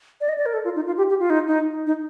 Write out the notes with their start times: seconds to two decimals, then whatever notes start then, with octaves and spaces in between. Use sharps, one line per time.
0.21 D5
0.29 D#5
0.38 D5
0.46 A#4
0.54 A4
0.65 F4
0.76 D#4
0.86 F4
0.97 G4
1.10 G4
1.20 F4
1.30 D#4
1.48 D#4
1.87 D#4